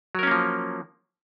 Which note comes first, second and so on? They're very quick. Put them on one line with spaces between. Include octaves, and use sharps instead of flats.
F#3 A#4 C#4 A#3 F3